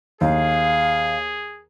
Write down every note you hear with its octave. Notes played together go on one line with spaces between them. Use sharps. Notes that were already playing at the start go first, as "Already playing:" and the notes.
D#2 G#4 F5